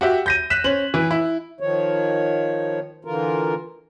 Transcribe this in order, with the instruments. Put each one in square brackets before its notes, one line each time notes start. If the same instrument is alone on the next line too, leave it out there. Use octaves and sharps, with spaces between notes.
[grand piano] F#4 G4 E5
G6 A#6 D#7
F#6 B6 E7
C#4 C5 F#7
E3
E4
[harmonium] D#3 F3 C#5
D3 E3 F4 A#4